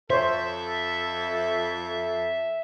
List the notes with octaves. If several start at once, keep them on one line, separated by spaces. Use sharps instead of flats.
F2 A4 C5 C#5 E5